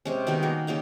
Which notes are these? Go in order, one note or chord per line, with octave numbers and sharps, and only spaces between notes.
C3 G#3 C#4
B2 D#3 G3 G#3
A#3 F#4 G#4
C#3 G3 A#3 D#4